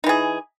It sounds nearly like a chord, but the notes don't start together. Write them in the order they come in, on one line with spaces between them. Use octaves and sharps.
D#4 E3 G#4